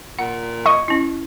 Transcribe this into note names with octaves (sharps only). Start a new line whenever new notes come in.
A#2 F#5
D#5 C#6
C#4 E4